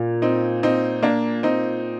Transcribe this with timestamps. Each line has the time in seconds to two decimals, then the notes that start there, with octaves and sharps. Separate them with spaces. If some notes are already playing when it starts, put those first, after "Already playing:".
Already playing: A#2
0.22 C4 D#4
0.63 C4 D#4
1.03 A#3 D4
1.43 C4 D#4